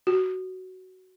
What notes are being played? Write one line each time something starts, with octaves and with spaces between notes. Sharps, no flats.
F#4